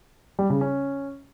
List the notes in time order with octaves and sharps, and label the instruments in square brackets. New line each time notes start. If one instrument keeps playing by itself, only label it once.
[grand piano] G3
C#3
C#4